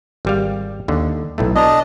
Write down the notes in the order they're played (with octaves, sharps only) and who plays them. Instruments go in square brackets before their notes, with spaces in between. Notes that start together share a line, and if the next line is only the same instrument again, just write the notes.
[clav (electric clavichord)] G#1 G3 F5
D#2 D3
B1 A2 A3
[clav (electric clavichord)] B2 A#5 [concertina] D4 D#5